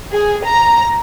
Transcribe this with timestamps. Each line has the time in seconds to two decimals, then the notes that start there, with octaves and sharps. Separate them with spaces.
0.11 G#4
0.44 A#5